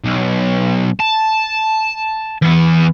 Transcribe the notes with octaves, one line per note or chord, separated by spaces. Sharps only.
B1
A5
E3 B3